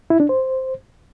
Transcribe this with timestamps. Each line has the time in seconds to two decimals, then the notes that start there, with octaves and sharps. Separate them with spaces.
0.10 E4
0.20 D4
0.29 C5